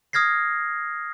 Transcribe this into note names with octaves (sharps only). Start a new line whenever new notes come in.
D#6 F6 G#6 A#6 C7